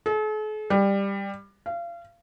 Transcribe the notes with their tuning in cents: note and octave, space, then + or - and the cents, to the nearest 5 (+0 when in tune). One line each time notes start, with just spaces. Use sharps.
A4 -45
G3 +15
F5 -30